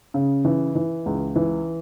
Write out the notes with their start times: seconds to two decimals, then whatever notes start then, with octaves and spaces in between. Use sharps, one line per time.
0.14 C#3
0.45 E3
0.75 E3
1.06 C#2
1.36 E3